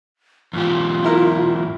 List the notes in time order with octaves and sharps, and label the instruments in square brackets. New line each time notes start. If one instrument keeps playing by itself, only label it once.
[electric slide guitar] E2 G#2 G4 [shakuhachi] F4
[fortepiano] E4 A#4